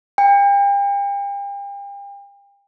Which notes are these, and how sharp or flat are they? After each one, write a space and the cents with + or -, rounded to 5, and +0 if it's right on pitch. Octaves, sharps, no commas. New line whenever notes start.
G5 +40